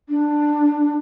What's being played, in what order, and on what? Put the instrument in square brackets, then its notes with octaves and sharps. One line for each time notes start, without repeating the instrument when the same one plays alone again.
[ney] D4